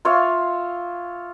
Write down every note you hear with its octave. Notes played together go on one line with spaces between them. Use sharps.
F4 C#5 E5 F5